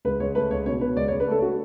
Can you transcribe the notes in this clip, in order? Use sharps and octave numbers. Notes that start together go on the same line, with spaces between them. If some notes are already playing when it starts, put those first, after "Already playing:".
C#2 B4
C#2 C#5
A3 B4
C#2 C#5
B2 C#5
B2 B4
C#2 D5
C#5
C#2
B4
A3 A4
F#4